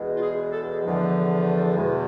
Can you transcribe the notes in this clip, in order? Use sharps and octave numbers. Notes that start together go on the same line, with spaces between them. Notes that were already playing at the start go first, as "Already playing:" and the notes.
Already playing: E2 B2 G#3
F4
G#4
A4
E2 D3 F3
E2 B2 G#3